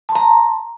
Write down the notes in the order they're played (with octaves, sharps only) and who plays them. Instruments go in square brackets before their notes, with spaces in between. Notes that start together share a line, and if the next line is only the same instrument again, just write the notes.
[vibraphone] A5
C6
A#5